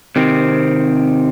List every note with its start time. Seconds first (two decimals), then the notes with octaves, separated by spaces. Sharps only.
0.16 C3 D#3 C4